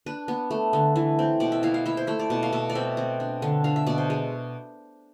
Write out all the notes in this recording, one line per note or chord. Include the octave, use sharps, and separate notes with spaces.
D4 B4
B3
A3
D3
E3
C4
B2 D5
E5
E4 F5
F5
E4 E5
C5
A3 E5
D5
B2
F5
B2 E5
D5
C4 E5
C4
D4
D3
D4 F5
E5
B2 D5
C5
G#3